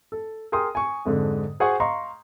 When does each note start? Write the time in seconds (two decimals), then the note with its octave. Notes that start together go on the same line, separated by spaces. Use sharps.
0.12 A4
0.52 G#4 A#4 G5 C6 D#6
0.75 G#5 C#6
1.05 F2 G#2 D3
1.60 F#4 G#4 C5 F#5 G#5 C#6
1.80 D#5 F5 A#5 C6 C#6